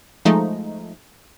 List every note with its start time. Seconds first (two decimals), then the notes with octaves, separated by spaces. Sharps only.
0.25 F3 G#3 A3 D#4